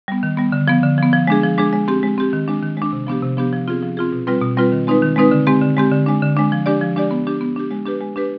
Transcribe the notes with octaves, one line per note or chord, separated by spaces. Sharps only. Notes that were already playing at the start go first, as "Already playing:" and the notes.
G3 B3
D#3
G3 B3
D3
F3 B3
D3
F3 B3
F3
G#3 D4 G#4
F3
G#3 D4 G#4
G#3
C4 G4
G#3
C4 G4
D#3
G#3 D4
D#3
G#3
D4
C3
F3 B3 D4 G4
C3
F3 B3 D4 G4
F3
C4 F4 G#4
F3
C4 F4 G#4
B2
G3 C4 F4 B4
B2
G3 C4 F4 B4
D#3
G#3 C4 D#4 B4
D#3
G#3 C4 D#4 B4
D3
G#3 C4 G4
D3
G#3 C4 G4
D3
G#3 D4
D3
G#3 D4
F3
G#3 D4 G4 D5
F3
G#3 D4 G4 D5
B3
D4 G4
B3
D4 G4
G#3
D4 G4 B4
G#3
D4 G4 B4